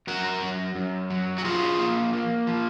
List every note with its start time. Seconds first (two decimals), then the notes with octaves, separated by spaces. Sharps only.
0.07 F#2 F#4 A#4
0.42 F#2
0.75 F#2
1.10 F#3
1.38 F#4
1.44 F3 F4 G#4
1.79 A#3
2.13 A#3
2.47 F3